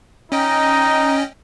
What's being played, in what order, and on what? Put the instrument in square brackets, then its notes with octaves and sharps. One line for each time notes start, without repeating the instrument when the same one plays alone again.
[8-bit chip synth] C#4 D#5 G5 [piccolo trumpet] D#4